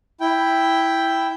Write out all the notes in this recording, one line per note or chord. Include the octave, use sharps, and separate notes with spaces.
E4 G5